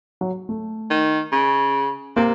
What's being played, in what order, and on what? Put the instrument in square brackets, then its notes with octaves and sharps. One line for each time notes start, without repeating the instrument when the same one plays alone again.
[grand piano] F#3
A3
[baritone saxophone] D#3
C#3
[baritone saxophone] C3 [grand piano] A#3